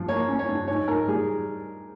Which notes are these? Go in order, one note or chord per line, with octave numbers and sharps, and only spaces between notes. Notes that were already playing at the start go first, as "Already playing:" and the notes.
Already playing: G2 F3
A#3 C#5
C#4
C#5
G2
G#2 C#5
G#2 A#4
G3 G#4